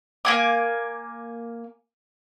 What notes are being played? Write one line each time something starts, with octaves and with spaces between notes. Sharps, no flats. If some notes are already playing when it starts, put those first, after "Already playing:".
A#3 G#5 D6